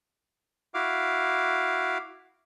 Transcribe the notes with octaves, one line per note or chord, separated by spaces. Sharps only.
E4 F#4 F5 D6